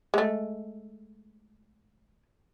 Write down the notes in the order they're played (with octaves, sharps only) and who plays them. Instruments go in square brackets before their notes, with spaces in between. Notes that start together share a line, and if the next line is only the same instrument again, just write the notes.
[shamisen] G#3 A3